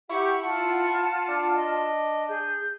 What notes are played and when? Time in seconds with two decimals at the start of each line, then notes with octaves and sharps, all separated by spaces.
0.10 E4 G4 F#5 C#6
0.43 F4 F#5 A5
1.29 D4
1.55 D#5
2.29 G#4 G6